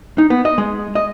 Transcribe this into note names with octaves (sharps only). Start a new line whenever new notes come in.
D#4
B3
D#5
G#3
D#5